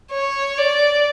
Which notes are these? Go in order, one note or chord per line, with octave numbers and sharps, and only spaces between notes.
C#5
D5